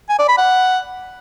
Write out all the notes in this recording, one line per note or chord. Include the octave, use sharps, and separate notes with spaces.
G#5
D5
B5
F#5